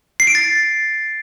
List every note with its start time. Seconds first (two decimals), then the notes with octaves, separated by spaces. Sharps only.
0.20 C7
0.27 D7
0.35 A6